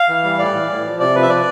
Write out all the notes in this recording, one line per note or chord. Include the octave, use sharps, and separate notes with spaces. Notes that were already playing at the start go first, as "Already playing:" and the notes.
Already playing: F5
E3
G3
A2 D5
E3
A2
F3
C3 D5
F3 B4
E5
D5